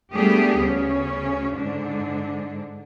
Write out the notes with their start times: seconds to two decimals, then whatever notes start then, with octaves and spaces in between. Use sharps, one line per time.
0.13 G3 A3 B3 D4 G4 G#4
0.61 D2 C#3 C#4
1.56 G#2 D3 D4